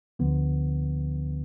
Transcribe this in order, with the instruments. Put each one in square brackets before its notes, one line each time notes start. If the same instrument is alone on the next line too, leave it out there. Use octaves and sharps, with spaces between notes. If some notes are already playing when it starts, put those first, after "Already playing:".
[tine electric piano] D2 D3 F3 B3